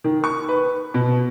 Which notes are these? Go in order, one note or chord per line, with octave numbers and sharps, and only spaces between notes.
D#3
C#6
B4
B2